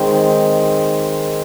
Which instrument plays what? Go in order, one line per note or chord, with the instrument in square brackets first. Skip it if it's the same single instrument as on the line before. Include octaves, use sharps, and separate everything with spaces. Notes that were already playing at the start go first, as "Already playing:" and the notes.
Already playing: [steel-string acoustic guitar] D#3 G#3 C4